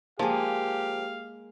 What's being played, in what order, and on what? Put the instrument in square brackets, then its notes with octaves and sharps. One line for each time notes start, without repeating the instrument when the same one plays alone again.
[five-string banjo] F3 [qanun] G#3 A#3 [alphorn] G4 [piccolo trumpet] F5